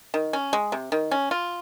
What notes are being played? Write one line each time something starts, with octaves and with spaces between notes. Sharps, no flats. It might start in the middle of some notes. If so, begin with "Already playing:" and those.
D#3
C#4
G#3
C3
D#3
C#4
F4